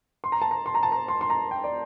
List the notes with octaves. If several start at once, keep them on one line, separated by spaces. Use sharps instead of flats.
C6
A#5
A5
A#5
C6
A#5
A5
A#5
C6
C6
A#5
G5
D5